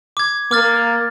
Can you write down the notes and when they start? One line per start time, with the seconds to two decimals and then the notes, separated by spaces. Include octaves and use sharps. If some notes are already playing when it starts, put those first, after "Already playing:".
0.17 D6 G#6
0.51 A#3 D6 F6 A6